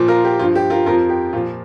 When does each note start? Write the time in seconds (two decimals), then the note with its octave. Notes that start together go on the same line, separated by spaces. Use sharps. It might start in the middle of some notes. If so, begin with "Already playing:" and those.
Already playing: A#2 F3
0.08 F4 A#4
0.24 G4
0.39 G2 F3 F4
0.55 G4
0.70 F4 A#4
0.86 F2 F3 F4 A#4
1.09 G4
1.33 A#2 F3 F4